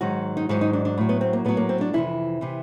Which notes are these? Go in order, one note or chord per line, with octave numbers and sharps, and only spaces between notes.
G#2 D#3 F#3 F#4
D#4
G#2 D#3 F#3 E4
D#4
D4
D4
A2 F#3
B3
C4
A#3
A2 F#3 B3
A#3
C4
D4
F2 C3 E3 E4
C3 E3